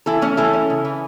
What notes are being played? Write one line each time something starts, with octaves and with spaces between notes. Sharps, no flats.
E3 E4 A4
A3 C#4
E3 E4 A4
C#4
C#3
E3